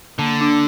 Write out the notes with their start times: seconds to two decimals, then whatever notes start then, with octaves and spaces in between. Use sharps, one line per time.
0.19 D3 A#3
0.41 D4